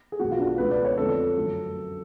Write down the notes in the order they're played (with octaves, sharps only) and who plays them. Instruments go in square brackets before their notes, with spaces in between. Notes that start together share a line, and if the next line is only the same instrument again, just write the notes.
[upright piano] G#4
B1 B2 A3 F#4
F4
D4
C#2 B2 A3 B4
D5
C#5
F2 D3 F3 A3 A4
F#2 D3 F#3 A3